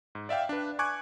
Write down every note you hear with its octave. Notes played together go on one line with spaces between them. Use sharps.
G#2
D5 E5 F5 G5
D4 B4
G#5 C#6 D6 F#6 G#6